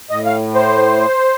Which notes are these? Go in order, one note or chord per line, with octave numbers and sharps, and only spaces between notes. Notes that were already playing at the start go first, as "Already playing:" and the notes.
A2 D#5
F5
C5